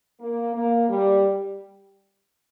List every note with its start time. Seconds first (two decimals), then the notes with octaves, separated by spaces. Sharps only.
0.21 A#3
0.55 A#3
0.90 G3